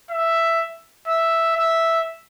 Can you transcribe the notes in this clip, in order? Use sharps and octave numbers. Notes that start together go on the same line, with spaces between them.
E5
E5
E5